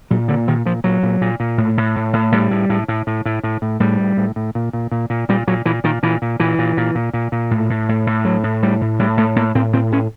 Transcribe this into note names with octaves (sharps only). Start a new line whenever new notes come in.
A#2 F#3
A#2 D3
A#2 D#3
A#2 F3
A#2 F#3
A#2
A#2
A#2
A2
A2
A2
A2
A2 G3
A2
A2
A2
A2
A2
A2
A2
A2 G3
A2
A2
A2
A#2
A#2
A#2
A#2
A#2 G3
A#2 F#3
A#2 E3
A#2 D#3
A#2 E3
A#2
A#2 E3
A#2
A#2
A#2
A#2
A#2
A2
A2
A2
A2
A2 F#3
A2
A2 G3
A2
A2 G3
A2 A3
A2 A#3
A2 C4
A2 C4
A2 C#4